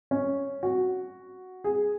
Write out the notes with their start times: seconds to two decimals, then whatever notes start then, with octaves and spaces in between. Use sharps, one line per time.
0.11 C#4
0.63 F#4
1.64 G#4